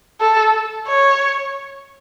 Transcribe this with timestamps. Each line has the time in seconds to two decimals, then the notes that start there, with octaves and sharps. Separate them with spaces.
0.20 A4
0.87 C#5